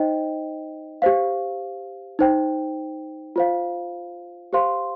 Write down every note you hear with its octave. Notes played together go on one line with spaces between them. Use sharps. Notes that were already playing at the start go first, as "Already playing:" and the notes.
Already playing: D#4 C5 D#5 G5
G4 C5 F5
D#4 C5 G5
F4 C5 F5
G4 C5 F5 C6